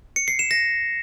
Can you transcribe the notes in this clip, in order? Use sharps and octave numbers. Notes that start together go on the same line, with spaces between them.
C#7
C7
E7
A#6